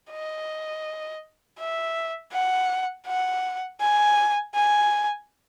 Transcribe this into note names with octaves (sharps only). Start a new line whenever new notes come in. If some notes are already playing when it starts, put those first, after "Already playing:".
D#5
E5
F#5
F#5
G#5
G#5